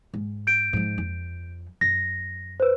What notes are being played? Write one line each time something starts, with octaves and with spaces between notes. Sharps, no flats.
G#2
G6 D7
G#2 F3
F2
F#2 A#6
B4 C5